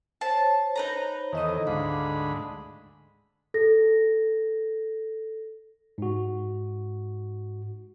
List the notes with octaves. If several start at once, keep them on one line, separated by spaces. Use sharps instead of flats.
C5 C#5 A5
D#4 B4 A#5
E2 D#3 A4 D#5 D#6
D2 G#2 F5 B5 D6
A4 A#6
G#2 F#4